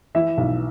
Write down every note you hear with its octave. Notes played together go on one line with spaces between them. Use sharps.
E3 E5
B1